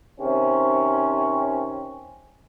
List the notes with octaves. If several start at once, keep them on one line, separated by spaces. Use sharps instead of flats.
C3 D#3 C4 C#4